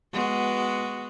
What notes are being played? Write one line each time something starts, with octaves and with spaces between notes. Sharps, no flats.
G#3 B3 F#4